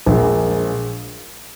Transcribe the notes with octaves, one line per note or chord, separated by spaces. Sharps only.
A#1 A#2 G#3